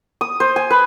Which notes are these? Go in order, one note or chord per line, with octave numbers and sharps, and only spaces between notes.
D#6
C5
G#5
B4